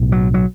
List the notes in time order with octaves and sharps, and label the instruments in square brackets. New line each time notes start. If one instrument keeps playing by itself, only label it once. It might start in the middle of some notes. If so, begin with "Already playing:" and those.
Already playing: [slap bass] B1 A2
F#3
F#3